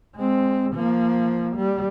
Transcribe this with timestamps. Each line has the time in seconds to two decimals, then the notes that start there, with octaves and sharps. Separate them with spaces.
0.16 G#3 C4
0.74 F3 A#3
1.56 G3